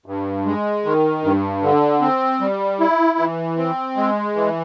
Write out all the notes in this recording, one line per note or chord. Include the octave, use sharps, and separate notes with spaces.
G2
G#3
D#3
G2
D3
C4
G3
E4
E3
C4
G#3
E3